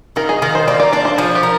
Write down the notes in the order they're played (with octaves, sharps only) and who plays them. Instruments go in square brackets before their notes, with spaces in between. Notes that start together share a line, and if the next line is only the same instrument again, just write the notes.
[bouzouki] D#3 [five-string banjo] A#4
[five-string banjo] G#4
[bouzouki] D#3 [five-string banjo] A#4
[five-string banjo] C5
[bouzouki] A#3 [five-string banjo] D5
[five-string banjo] D5
[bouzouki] D4 [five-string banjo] D5
[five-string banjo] C5
[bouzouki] F3 [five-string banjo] G#4
[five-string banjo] G4
[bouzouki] A#4